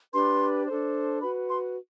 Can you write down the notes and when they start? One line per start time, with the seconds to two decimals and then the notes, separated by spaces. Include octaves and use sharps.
0.13 D4 G4 B4 C6
0.67 D4 A4 C5
1.21 F#4 B4 B5
1.49 C6